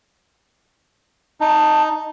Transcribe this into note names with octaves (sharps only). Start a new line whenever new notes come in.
D#4 A5